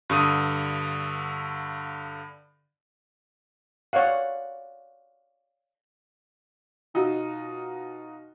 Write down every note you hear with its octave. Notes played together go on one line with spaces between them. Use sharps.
G2 D3 D#6 D#7
C#5 D5 F5 F#5
B2 D#4 F4 F#4